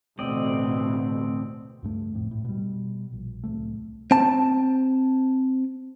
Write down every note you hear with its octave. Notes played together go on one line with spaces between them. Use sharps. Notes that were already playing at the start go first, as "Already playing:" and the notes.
A1 D2 B2 C4 D5 D#5
C#2 G2 A3
G1 F2 A2
A2
B2 G3
A#1
D1 C2 A3
C4 A5